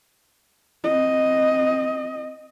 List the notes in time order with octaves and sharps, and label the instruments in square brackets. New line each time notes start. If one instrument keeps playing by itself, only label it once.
[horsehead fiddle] C4 D#5